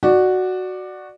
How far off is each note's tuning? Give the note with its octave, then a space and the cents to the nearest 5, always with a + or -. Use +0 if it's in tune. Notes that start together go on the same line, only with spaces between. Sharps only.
F#4 +0 D5 +15